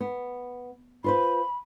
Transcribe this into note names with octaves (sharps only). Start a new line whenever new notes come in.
B3
F4 B4 C5 B5